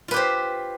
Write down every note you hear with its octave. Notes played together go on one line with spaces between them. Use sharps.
F4 G4 B4 C5